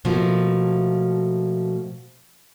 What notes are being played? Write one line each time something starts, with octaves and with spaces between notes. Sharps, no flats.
B2 F3 A3 A#3